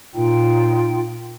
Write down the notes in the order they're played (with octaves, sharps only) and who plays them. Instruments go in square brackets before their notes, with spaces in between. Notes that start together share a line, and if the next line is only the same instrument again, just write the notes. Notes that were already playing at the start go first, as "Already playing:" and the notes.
[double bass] A#2 [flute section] D#4 F4 G5